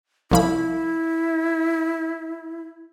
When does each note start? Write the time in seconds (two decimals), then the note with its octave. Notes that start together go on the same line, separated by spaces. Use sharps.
0.31 C2 F3 E4 B5